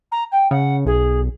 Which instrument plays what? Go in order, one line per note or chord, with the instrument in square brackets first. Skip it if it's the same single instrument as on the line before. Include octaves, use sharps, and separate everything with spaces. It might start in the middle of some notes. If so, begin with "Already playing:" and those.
[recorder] A#5
G5
[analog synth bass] C#3 [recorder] F#5
[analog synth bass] B1 [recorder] G#4